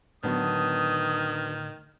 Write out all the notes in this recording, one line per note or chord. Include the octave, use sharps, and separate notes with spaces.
A2 D3 D#3 F#3 B3 C#4 D4 D#6